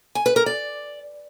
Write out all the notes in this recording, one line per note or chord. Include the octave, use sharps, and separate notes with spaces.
G#5
B4
A#4
D5